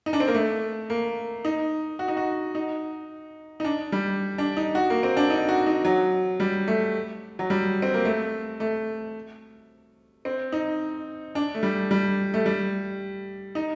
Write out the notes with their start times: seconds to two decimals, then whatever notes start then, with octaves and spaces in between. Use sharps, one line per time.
0.06 D#4
0.13 D4
0.20 C4
0.28 A#3
0.35 A3
0.90 A#3
1.45 D#4
1.99 F#4
2.08 D#4
2.17 F#4
2.55 D#4
3.60 D#4
3.65 D4
3.92 G3
4.38 D4
4.57 D#4
4.75 F#4
4.90 A#3
5.03 C4
5.17 D4
5.30 D#4
5.49 F#4
5.66 D#4
5.85 F#3
6.40 G3
6.68 A3
7.39 F#3
7.50 G3
7.82 C4
7.94 A#3
8.05 A3
8.60 A3
10.25 C4
10.52 D#4
11.35 D4
11.55 A3
11.63 G3
11.91 G3
12.34 A3
12.46 G3
13.55 D#4